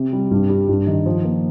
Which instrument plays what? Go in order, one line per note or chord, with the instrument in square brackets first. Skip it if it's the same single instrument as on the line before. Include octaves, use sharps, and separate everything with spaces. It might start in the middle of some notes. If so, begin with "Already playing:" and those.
Already playing: [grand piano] C3
G3
G2
G3
G2
D#3
F3
A#3